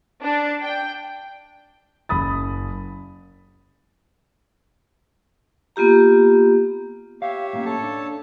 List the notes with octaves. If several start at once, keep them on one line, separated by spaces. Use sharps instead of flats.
D4
G5
F#1 B5 D#6 A6
A#3 B3 F4 G4 A#5
G4 C#5 E5 F5
A2 A#3 C#4
A4 C#5 A5
D4